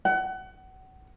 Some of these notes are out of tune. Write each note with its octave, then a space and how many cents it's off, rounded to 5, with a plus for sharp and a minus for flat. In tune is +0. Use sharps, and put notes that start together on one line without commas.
F#5 +30